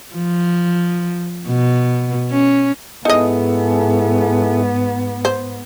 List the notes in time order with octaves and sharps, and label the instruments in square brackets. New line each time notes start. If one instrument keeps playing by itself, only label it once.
[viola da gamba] F3
B2
C#4
[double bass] G#2 B3 [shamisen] D#4 D#5 [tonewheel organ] E4 G#4 A4
[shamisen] C5